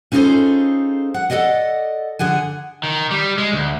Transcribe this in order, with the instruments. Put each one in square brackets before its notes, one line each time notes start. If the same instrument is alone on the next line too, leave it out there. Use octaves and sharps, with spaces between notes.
[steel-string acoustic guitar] C#4 D#4 F4 G#4 A4 C5
F#5
A4 A#4 D5 D#5 F#5
D3 G#4 F#5 G#5
[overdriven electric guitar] D#3
G3
G#3
D2